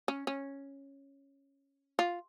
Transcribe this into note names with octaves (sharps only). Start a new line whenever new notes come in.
C#4
C#4
F4